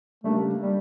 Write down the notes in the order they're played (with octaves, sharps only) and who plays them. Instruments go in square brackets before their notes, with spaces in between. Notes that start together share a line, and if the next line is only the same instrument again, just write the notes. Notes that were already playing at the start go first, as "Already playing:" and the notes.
[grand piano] C#3 G3 A#3 D4 [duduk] A3
[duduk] G3